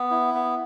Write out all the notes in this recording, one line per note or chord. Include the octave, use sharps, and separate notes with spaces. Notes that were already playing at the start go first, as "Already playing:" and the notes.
Already playing: B3
E4
B3